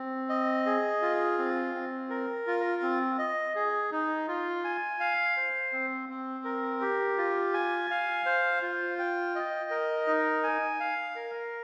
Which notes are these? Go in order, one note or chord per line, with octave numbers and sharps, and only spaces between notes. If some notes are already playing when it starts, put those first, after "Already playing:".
Already playing: C4
D#5
G#4
F4
C4
C4
A#4
F4
C4
D#5
G#4
D#4
F4
G#5
F5
C5
C4
C4
A#4
G4
F4
G#5
F5
C5
F4
G5
D#5
A#4
D#4
G#5
F5
A#4